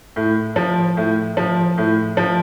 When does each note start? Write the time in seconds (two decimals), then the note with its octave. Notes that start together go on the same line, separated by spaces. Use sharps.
0.16 A2
0.56 F3
0.97 A2
1.37 F3
1.78 A2
2.17 F3